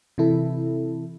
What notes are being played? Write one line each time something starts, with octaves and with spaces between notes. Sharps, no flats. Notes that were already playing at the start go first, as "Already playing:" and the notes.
C3 E3 E4 A4